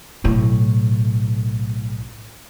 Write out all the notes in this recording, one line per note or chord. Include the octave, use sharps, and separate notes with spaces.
B1 A2